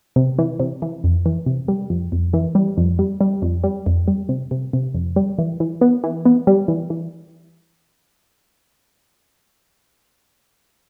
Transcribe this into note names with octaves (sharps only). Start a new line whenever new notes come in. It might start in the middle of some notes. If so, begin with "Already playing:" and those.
C3
E3
C3
E3
F2
E3
C3
G3
F2
F2
E3
G3
F2
G3
G3
F2
G3
F2
G3
C3
C3
C3
F2
G3
E3
E3
B3
E3
B3
G3
E3
E3